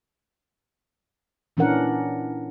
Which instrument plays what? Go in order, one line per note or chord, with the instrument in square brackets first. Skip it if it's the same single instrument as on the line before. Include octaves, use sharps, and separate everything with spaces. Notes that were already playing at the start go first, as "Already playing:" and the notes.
[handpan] A#2 E3 C#4 D4 A#4 F#5